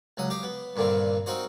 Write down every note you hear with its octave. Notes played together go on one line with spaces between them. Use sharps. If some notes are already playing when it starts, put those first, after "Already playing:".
C#2 F#3 D#6
G4 D#5 F5
B3
G2 A#2 D3 D#3 C4
C4 D#4 F4 F#4 C5 D#5